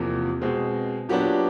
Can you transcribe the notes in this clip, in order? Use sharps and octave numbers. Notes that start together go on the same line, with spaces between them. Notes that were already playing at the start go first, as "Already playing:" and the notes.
Already playing: E2 C3 F3 A#3
B2 G#3 C4
A#2 F#3 B3 D4 G4